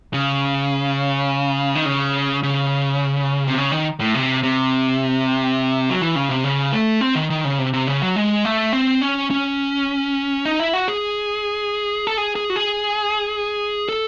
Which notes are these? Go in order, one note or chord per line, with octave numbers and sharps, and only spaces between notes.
C#3
D#3
C#3
C#3
C3
C#3
D#3
A2
C3
C3
F#3
E3
C#3
C3
C#3
A3
C4
D#3
D#3
C#3
C3
C3
C#3
F#3
G#3
A3
C4
C#4
C#4
D#4
E4
F#4
G#4
A4
G#4
G#4
F#4
G#4
A4